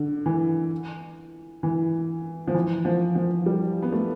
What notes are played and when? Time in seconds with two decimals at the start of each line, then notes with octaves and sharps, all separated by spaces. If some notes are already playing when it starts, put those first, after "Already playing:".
Already playing: D3
0.26 E3
1.63 E3
2.48 F3
2.55 E3
2.85 F3
3.15 F3
3.46 G3
3.82 B3
3.92 A3